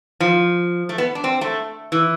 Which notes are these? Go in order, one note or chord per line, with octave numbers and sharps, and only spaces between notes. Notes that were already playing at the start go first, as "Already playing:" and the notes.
F3
A3
B3
D4
C4
A3
E3